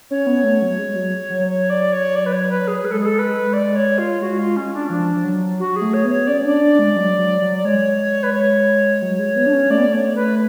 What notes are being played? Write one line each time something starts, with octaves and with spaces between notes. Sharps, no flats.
C#4 C#5
B3
A3
F#3
G#3
F#3
F#3
C#5
D5
C#5
D5
B4
C#5
B4
G#4
G#3 B4
A4
G#4
A4
B4
D5
C#5
F4
G#3 F#4
F4
C#4
D4
F3 D4
F3
F#3
F#4
G#4
A3
C#5
B3
C#5
C#4 D5
D4 D5
D4
G#3
F#3
F#3
F#3
D5
G#3 C#5
B4
C#5
F#3
G#3
B3
D4
C#4
A3 D5
B3
A3
C#5
B4